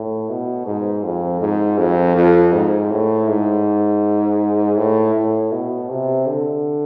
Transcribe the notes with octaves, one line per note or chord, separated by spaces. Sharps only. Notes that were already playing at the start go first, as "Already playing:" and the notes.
Already playing: A2
B2
G#2
F2
G#2
F2
F2
G#2
A2
G#2
A2
A2
B2
C3
D3